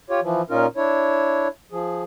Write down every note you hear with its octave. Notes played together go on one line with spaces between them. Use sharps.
F4 G4 C#5
E3 F3
A#2 C#4 D#4 F4 A#4
D4 E4 C#5
F3 G#4